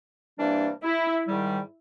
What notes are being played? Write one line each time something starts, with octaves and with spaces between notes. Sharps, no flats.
C3 E3 G3 A#3 D4
E4
G#2 D#3 G3